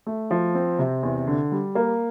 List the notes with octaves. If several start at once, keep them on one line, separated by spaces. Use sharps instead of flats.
A3
F3
C4
C3
E2
D3
G3
A#3